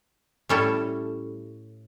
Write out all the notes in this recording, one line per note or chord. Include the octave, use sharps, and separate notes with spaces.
A2 G3 C#4 E4 A4